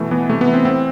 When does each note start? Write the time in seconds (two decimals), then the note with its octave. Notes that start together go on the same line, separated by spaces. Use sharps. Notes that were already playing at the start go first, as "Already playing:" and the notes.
Already playing: B2 E3 A3
0.11 E3 B3
0.29 C3 A3
0.41 B3
0.48 E3
0.53 C4
0.65 A2 C4